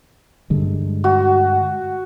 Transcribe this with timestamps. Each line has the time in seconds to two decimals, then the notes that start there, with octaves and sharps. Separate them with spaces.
0.50 G2 D3 G#3
1.04 F#4